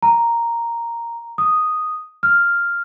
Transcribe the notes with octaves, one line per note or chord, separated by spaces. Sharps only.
A#5
D#6
F6